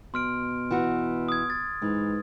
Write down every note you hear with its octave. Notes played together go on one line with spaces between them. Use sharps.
B2 C6 F6 D7
E3 F#4
D#6 G#6
D#6 A6
G#2 E3